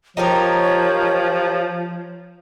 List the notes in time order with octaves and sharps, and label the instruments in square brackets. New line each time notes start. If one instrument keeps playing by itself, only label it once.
[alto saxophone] F3 [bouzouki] D#4 G4 A#4 [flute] C#5